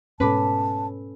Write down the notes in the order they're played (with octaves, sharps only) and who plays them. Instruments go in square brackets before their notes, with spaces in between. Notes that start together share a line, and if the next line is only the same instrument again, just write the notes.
[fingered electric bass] G#2 B2 [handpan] C#4 A4 [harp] B4 B5 D6 [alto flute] A5